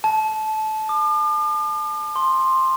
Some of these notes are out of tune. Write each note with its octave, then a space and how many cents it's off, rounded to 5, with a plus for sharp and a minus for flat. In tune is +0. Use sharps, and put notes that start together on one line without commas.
A5 -20
D6 +45
C6 +10